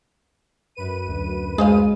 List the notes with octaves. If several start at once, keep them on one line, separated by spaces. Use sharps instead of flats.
F#2 B4 D#7
D2
G#3 G#4 C5 F5